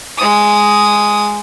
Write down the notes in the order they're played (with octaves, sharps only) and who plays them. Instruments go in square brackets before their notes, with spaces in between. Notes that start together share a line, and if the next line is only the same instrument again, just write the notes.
[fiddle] G#3 D#6